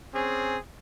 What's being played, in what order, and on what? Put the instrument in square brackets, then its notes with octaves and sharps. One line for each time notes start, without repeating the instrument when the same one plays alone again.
[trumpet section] C4 C#4 G#4